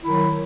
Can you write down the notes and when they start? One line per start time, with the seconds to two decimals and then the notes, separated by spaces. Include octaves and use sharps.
0.04 E4
0.06 D#3
0.09 F#3